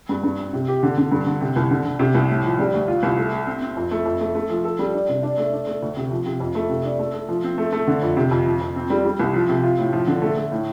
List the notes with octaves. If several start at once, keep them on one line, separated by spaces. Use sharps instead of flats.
G2
G2
C4
C3
G4
D3
D3
G2
D3
C3
C2
D3
D3
C3
C2
A2
F3
G3
D2
F4
C2
A3
A3
C4
C4
F2
A3
F2
A3
A3
F3
A4
G3
D4
C3
D4
A3
D4
A3
D2
C3
F3
C3
F2
A3
C3
D4
A3
A3
F3
C4
A3
A3
D3
F2
C3
F2
F3
F2
C4
G3
G3
C2
F3
C3
F4
A2
F3
D3
A3
A3
A2